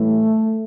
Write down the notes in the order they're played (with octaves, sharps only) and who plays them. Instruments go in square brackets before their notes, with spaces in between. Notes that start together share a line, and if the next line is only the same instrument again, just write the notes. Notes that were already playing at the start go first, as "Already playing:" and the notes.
Already playing: [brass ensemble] A2 E3 G3 A3